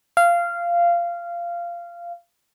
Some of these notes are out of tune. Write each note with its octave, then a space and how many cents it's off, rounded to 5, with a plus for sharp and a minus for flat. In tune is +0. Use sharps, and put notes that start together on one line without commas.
F5 -15